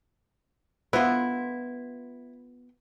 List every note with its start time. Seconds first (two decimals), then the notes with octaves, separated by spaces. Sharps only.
0.93 B3 E4 F4